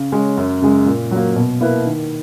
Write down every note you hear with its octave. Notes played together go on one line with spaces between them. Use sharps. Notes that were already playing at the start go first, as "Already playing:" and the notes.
Already playing: C#3
G#3 C#4
F#2
C#3 G#3
A#2
F#3 A#3
B2
A#3 E4 B4
D#3